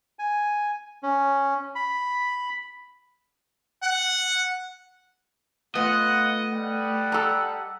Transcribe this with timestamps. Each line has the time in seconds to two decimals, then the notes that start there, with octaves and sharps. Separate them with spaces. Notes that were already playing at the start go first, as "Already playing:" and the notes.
0.19 G#5
1.03 C#4
1.75 B5
3.83 F#5
5.75 A3 B3 F4 D#5 F#5
6.53 G3 F#5
7.12 A4 A#5